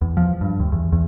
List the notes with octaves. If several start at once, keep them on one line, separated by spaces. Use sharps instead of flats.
E2
F3
G2
D#2
E2
E2